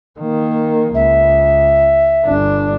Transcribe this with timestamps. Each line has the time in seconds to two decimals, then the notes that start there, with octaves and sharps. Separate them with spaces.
0.19 D#3 A#3
0.94 C#2 E5
2.26 G1 D4